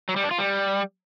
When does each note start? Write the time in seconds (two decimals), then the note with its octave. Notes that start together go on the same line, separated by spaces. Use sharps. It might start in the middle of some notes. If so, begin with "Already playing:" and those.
0.09 F#3
0.16 G3
0.24 D4
0.31 F4
0.39 G3